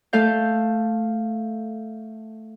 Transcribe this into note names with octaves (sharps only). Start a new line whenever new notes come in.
A3 A4 F5 G6